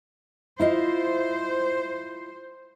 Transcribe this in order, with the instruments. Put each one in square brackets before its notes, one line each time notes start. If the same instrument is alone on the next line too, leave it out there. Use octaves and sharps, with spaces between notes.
[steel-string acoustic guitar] E4 F4 D#5 [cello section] C5